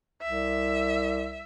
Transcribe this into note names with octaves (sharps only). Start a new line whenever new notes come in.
C2 E5